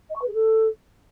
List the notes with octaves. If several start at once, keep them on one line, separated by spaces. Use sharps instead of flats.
D#5
C#6
B4
G#4
A4